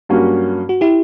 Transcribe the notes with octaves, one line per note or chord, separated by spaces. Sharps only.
G2 F#3 A#3 C#4 F#4
F#4
E4 G4